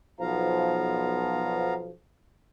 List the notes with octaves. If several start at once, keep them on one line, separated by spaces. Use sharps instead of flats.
B1 F3 B3 F5 A#5